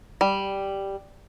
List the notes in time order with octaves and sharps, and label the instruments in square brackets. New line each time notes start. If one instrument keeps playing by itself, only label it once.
[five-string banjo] G3